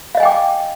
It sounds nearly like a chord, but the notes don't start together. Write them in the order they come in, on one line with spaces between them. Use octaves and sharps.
F5 D#5 G#5 G5 D6